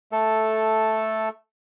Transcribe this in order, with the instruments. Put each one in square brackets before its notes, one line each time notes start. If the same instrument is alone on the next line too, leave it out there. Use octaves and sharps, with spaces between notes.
[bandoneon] A3 A4